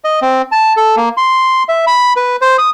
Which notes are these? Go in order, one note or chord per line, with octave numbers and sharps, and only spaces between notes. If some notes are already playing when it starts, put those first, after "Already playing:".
D#5
C4
A5
A4
A#3
C6
E5
B5
B4
C5
D#6